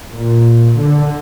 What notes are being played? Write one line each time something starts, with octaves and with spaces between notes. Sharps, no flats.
A#2
D3